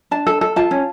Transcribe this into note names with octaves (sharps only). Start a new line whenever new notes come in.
D4 A5
A4
A4
F4 A5
C#4